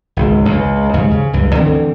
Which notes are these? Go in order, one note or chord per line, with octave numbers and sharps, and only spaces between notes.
G#1 C#2
C#2
D#2 G#2 C#3
C#3
C#2 G2
D2 D3 E3 C4